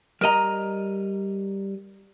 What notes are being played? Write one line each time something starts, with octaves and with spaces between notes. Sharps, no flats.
G3 A#4 D#5 A#5